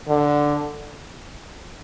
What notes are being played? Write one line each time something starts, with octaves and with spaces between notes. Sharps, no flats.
D3